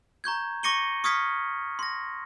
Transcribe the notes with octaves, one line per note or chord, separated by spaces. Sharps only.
A#5 C#6 G6 G#6
C#6 D6 A#6 C#7 D#7 G7
C#6 D#6 F6 G#6 B6 C#7
C6 A#6